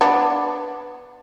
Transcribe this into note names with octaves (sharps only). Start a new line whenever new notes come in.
B3 D4